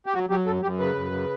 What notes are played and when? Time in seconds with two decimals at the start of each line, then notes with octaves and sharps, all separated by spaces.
0.06 G4
0.14 F#3 F#4
0.30 F#3 G4
0.46 F#2 A4
0.63 F#2 G4
0.79 C#3 B4
0.95 F#2
1.12 C#3